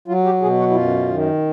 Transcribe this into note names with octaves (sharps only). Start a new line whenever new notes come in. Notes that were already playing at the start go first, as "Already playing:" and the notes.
F#3 F4
G4
B2 G#4
F#4
E4
F#2 F4
D#3